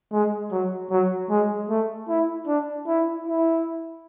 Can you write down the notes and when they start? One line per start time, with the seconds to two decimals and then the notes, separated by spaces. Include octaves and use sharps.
0.12 G#3
0.52 F#3
0.91 F#3
1.30 G#3
1.69 A3
2.08 E4
2.47 D4
2.87 E4
3.27 E4